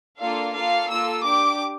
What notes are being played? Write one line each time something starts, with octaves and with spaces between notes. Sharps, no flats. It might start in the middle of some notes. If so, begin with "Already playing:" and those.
A#3 D4 F4 A4 F5
A#3 F4 A4 F5
A#3 F4 A4 E6
D4 G4 D6